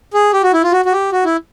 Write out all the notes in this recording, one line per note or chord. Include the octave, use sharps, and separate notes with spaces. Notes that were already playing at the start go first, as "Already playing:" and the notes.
G#4
G4
F#4
E4
F4
F#4
F#4
G4
F#4
E4